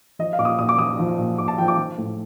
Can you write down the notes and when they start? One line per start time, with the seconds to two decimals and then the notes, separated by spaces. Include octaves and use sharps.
0.19 F3 D#5
0.33 F5
0.39 A#2 D6
0.45 D#6
0.59 A#2 D#6
0.69 D6
0.79 F3 D#6
0.99 F3
1.18 A#2
1.38 A#2 D6
1.48 A5
1.58 F3 G5
1.68 D6
1.78 F3
1.98 A2